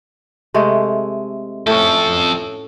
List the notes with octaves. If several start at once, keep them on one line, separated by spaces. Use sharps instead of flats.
C3 G#3 A3
F2 A2 C#4 A4